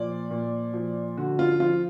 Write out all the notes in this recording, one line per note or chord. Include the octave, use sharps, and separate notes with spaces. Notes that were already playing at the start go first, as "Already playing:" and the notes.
Already playing: A#2 F3 D5
A#2
F3
D3 F#4
F4
F3 F4